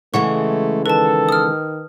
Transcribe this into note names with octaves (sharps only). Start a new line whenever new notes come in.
C#3 E3 G#3 A3 F#5 C#6
D#3 A4 B4 A5
D#6 F6